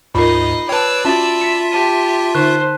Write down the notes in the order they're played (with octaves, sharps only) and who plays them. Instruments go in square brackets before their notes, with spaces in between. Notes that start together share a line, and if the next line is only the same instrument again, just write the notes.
[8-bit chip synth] D2 G#2 [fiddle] D#4 D#5 [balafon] F4 A#4 [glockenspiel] B5 C7
[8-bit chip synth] B4 C#5 [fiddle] D5 E6 [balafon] G5 A5
[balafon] C#4 F#4 [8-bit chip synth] F4 E5 [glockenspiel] A5 A6
[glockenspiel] B6 C#7 E7
[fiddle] G4 [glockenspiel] A5 B6 D#7
[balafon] D3 D#4 C#6 [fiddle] C5 [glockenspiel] F#6